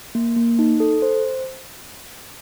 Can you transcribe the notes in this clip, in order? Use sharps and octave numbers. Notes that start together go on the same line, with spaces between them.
A#3
A#3
D#4
A4
C5